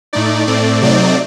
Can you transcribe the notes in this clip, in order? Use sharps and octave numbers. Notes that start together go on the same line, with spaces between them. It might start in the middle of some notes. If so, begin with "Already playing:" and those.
A2 A3 D#4 D5
A2 A3 C4 D5
C3 F#3 A3 C4 D#4 D5